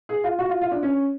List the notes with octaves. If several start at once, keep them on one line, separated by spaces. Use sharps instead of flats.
G#4
F4
F#4
F4
F4
D4
C#4